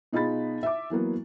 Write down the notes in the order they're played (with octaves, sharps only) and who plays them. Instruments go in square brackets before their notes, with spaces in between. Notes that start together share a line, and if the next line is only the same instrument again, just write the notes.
[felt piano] B2 D#4 F4 G#4 B5 A6
E5 D6
E3 F#3 A#3 B3